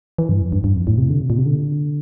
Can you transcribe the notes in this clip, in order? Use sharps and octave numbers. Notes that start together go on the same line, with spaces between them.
E3
G2
F2
G2
G2
F2
A2
C3
D3
C3
A#2
C3
D3